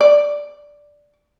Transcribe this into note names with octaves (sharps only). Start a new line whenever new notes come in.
D5